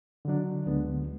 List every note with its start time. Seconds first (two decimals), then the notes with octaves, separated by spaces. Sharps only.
0.25 D3 F#3 D4
0.66 D2 D3 G#3 B3